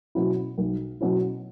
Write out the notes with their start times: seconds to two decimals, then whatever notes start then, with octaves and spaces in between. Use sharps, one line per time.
0.15 B2 F#3 C#4 E4
0.58 B1
1.01 B2 F#3 C#4 E4